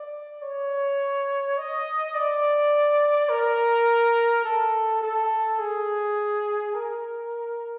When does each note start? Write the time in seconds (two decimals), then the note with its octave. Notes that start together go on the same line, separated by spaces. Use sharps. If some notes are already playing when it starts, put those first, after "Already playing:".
Already playing: D5
0.42 C#5
1.58 D#5
2.15 D5
3.29 A#4
4.44 A4
5.02 A4
5.59 G#4
6.74 A#4